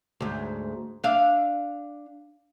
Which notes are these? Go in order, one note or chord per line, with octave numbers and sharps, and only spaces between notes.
D2 G#2
D4 E5 F5